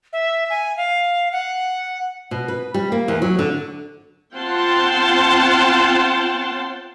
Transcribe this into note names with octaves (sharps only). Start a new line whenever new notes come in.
E5
G#5
F5
F#5
B2
B4
G3
A#3
E2
F#3
D3
C4 F4 F#5 G5 A5 C6